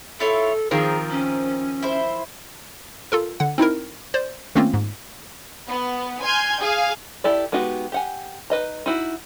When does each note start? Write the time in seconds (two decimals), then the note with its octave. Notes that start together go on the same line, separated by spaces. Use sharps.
0.20 E4 F4 A4 C#5
0.71 D#3 F3 C4 G#4 A#4
1.11 C#4
1.83 E4 C5
3.12 F4 A4 A#4
3.40 D3 F#5
3.58 C4 D#4 E4 A#4
4.14 C5 D5
4.55 D#3 A3 A#3 C4 C#4 F4
4.74 G#2
5.68 B3
6.22 G#5 C6 F6 G6 G#6
6.60 G#4 F5 G#5
7.24 E4 G4 A4 D5
7.52 G#3 B3 D#4 F#4 G4
7.92 G4 F#5 G#5
8.50 D#4 B4 D#5 A#5
8.86 D#4 E4 F#4